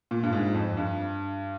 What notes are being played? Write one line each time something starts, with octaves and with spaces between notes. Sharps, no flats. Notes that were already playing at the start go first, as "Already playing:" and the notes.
A#2
G2
G#2
F2
G2